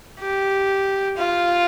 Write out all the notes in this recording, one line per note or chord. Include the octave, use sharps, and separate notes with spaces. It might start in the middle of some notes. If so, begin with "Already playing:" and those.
G4
F4